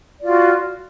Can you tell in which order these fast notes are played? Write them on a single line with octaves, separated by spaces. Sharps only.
D5 F4 F#4